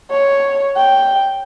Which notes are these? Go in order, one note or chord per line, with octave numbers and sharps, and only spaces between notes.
C#5
G5